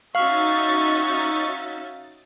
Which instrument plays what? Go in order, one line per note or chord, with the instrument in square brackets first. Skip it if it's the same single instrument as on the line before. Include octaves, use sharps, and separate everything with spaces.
[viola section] C#4 F#4 E5 [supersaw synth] D#4 A6 [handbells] F5 F6 [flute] C#6